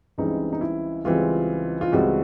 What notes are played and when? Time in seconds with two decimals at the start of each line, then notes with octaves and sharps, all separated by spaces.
0.18 C#2 C#3 E3 G3 C4 D#4
0.53 D#4
0.61 E4
1.05 C#2 C#3 E3 G3 C4 F4
1.81 F4
1.92 C#2 C#3 E3 G3 C4 F#4